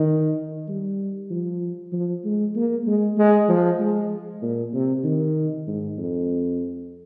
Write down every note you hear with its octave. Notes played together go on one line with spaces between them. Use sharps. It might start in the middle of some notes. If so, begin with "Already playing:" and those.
Already playing: D#3
G3
F3
F3
G#3
A#3
G#3
G#3
F3
G#3
A#2
C3
D#3
G#2
F2